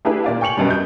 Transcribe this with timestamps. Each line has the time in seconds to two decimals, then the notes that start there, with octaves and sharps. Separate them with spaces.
0.05 A3 D4 E4 G4 G#4 B4
0.24 A#2 D5 F5
0.41 G5 G#5 C#6 C#7 F7 F#7
0.57 F#2 B2 F#3 G3
0.70 G6